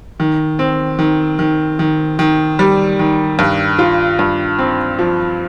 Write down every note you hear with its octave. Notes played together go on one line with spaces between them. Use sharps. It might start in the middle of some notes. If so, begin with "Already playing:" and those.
D#3
C4
D#3
D#3
D#3
D#3
G3
D#3
G2
F4
G2
C4
F3